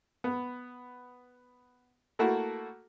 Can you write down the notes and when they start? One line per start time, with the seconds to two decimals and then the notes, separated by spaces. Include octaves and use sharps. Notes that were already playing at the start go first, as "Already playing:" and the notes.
0.24 B3
2.19 A3 A#3 E4 F#4 A4